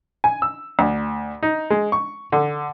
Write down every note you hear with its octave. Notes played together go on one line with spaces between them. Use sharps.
G#5
E6
D2
D#4
G#3
C#6
D3